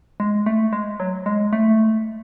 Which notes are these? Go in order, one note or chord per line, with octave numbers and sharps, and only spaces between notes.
G#3
A3
G#3
F#3
G#3
A3